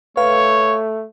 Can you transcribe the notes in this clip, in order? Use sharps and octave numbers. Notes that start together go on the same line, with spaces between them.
A3 B4 C#5 F5